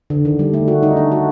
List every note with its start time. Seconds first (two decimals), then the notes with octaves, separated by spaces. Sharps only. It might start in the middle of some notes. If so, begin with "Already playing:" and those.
0.10 D3
0.25 D#3
0.39 G3
0.54 A3
0.68 F#4
0.83 D#4
0.97 D4
1.12 F#4